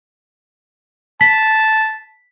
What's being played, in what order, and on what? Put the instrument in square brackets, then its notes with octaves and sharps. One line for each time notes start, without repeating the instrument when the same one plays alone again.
[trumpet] A5 [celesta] B6